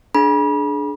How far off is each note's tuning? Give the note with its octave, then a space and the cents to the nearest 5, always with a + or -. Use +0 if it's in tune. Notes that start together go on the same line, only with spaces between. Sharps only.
D4 +0 G#4 +30 B5 -35